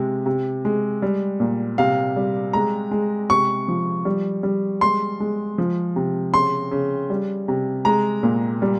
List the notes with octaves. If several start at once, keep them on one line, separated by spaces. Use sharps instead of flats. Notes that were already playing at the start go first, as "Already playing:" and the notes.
Already playing: C3 G#3
C3
G#3
G3
A#2
C3 F5
G3
G#3 A#5
G#3
C3 C#6
F3
G3
G3
G#3 C6
G#3
F3
C3
C#3 C6
C#3
G3
C3
G#3 A#5
A#2
G3